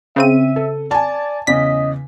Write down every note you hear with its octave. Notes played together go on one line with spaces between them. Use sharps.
C#3 C4 E5 D#7
A4
D5 G#5 A5
E2 C#3 D#5 B6